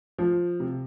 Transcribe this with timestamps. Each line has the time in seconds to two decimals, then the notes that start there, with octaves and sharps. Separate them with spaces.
0.18 F3
0.60 C3